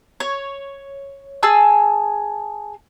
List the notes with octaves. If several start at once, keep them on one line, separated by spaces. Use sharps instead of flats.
C#5
G#4 G#5 A5 E6